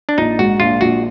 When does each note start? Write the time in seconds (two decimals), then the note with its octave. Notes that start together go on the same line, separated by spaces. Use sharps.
0.09 D4
0.18 A#1 D#4
0.39 G#2 F#4
0.60 A#1 F4
0.81 A#1 F#4